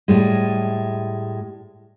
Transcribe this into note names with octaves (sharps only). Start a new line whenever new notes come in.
A2 G3 G#3